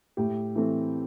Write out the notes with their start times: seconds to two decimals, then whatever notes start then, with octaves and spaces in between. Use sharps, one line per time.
0.17 A2 G4
0.55 E3 A3 C4